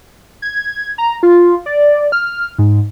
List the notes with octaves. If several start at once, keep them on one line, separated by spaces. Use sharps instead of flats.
G#6
A#5
F4
D5
F6
G#2